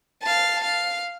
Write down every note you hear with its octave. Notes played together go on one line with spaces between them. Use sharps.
F5 A5
F5